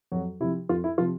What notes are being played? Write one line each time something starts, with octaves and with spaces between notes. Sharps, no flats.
F2 F#3 F#4
C3 F3 E4
F2 F4
E4
C3 F3 F4